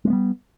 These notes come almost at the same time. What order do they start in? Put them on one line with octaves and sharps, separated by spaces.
G#3 A#3 B3 G3